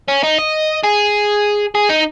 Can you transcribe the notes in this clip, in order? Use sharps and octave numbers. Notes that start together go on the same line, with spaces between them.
C#4
D#4
D#5
G#4
G#4
D#4